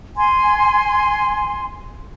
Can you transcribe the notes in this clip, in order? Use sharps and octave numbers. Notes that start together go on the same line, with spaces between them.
G#5 C6